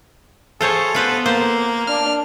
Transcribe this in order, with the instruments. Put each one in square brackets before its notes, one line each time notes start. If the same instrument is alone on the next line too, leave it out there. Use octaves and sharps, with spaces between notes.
[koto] F4 C5 C#5 [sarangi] G#4 [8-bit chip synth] A4
[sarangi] B3 [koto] F4 B4 C5
[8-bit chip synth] A#3 [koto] C5
[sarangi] D4 [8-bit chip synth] F6